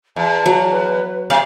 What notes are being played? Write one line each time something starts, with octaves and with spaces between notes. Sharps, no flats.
E2 A5
F#3
B4
C3 D5 F5